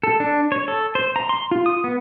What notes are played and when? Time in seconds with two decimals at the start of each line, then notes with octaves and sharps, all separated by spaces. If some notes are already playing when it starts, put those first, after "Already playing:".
0.03 A4
0.20 D4
0.52 C#5
0.68 A4
0.95 C5
1.16 A#5
1.29 C6
1.51 F4
1.66 D#6
1.84 B3